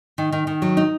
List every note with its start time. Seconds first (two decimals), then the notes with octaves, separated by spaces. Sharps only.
0.18 D#3
0.32 D#3
0.47 D#3
0.62 F#3
0.77 D#4